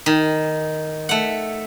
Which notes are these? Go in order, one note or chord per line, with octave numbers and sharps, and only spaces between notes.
D#3
A3 F#5